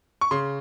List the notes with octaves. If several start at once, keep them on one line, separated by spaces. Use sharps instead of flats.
C#6
C#3 C6